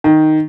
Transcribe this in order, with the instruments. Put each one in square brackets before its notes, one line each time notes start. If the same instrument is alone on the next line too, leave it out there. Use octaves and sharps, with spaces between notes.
[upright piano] D#3